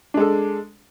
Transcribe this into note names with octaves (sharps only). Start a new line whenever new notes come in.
G#3 D4 A4